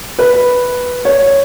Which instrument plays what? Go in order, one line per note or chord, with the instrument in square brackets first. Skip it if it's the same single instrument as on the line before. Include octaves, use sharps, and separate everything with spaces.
[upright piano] B4
C#5